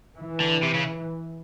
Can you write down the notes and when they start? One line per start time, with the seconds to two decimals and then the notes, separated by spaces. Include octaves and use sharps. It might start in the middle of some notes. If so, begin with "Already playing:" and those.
0.18 E3
0.40 D3
0.63 C3
0.75 C#3